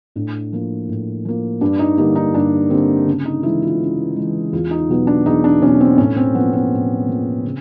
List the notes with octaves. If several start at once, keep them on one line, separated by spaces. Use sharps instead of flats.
A2 D4
F3 A#3
A2
F3 A#3
G2 D4
D#4
D3 G3 A#3 D#4
D#4
G2 D4
D3 G3 A#3 C4
C#3
D#4
E3 G#3 E4
F4
C#3
E3 G#3
E2 F4
D#4
B2 F#3 B3
D4
E2 D#4
D4
B2 F#3 B3 C#4
C4
A2 C#4
C4
F3 A#3 B3
C4
A2
F3 A#3
C#3